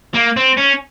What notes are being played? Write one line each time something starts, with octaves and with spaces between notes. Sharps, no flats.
A#3
C4
C#4